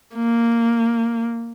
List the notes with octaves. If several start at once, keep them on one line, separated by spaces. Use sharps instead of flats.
A#3